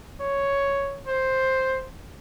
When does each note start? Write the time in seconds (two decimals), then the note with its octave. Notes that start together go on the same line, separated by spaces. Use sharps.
0.20 C#5
1.07 C5